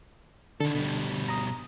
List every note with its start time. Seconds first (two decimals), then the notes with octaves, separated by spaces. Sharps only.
0.60 D3 D#3 A4
0.75 B2 G3
1.29 A#5 D#6